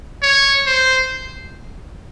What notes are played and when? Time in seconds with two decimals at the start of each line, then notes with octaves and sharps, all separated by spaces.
0.22 C#5
0.67 C5